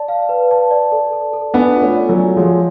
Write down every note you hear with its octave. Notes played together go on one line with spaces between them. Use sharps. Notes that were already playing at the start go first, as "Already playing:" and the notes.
Already playing: D5 A5
F5
B4
A5
D5
A4
A4
A4
B3 D4 G#5
F4
A3 C#4
D5
F#3 A3
G#5
F3 G#3 C#5